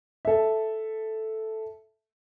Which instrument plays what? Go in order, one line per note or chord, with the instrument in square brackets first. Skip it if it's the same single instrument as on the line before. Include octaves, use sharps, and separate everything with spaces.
[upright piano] A4 E5